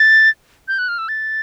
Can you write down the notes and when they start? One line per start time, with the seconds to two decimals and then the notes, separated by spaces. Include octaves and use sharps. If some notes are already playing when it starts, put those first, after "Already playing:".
Already playing: A6
0.68 G6
0.79 F#6
0.89 F6
0.98 E6
1.09 A6